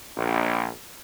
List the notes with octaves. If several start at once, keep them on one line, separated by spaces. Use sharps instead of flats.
A#1